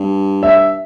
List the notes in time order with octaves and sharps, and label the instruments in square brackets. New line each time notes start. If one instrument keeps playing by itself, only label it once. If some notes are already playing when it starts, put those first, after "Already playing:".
Already playing: [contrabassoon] G2
[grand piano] E5